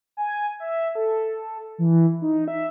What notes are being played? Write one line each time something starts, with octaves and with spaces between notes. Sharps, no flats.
G#5
E5
A4
E3
D#4
E5